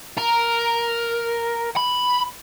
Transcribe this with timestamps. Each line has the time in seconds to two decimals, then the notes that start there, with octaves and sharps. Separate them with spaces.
0.18 A#4
1.76 B5